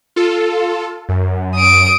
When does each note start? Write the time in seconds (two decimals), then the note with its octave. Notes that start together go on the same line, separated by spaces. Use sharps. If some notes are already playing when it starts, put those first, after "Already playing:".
0.16 F4 A4
1.09 F#2
1.55 D#6 D7